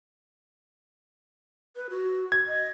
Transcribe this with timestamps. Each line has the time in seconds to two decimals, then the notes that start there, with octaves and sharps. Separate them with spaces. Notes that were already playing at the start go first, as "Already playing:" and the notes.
1.76 B4
1.90 F#4
2.32 G#6
2.47 D#5